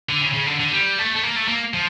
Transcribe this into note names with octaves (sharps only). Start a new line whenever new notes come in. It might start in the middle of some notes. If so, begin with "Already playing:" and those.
D3
C#3
C#3
D3
D3
G3
A3
A3
A#3
A3
A#3
F3